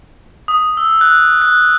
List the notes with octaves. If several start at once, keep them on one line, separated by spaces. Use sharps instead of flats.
D#6
E6
F#6
F#6